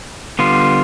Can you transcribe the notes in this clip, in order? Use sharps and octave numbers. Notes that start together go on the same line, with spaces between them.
D3 G3 B3 F4